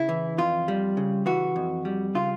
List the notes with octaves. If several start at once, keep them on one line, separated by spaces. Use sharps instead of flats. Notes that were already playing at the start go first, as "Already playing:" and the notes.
Already playing: C#3 E4
E3
F2 F4
G3
C#3
E3 F#4
F2
G3
C#3 F4